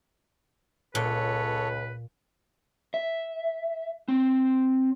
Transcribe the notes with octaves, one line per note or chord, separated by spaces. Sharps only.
C#2 A#2 A4 B4 C#5
E5
C4